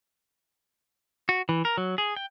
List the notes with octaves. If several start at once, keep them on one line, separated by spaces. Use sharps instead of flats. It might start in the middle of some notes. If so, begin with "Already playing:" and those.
F#4
E3
A#4
F#3
G#4
G5